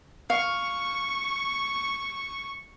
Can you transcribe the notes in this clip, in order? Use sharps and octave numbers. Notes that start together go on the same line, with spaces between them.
F5 C#6